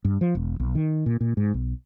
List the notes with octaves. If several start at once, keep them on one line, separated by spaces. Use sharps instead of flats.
G2
F3
E1
B1
D#3
A#2
A#2
G#2
B1